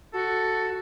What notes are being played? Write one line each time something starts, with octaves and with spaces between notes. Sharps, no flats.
F#4 A4